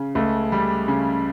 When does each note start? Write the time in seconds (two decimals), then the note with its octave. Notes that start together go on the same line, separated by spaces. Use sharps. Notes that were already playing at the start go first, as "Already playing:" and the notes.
Already playing: C#3
0.15 C#2 A3
0.52 G3
0.88 C#3